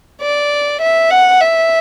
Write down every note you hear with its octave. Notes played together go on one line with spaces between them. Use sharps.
D5
E5
F#5
E5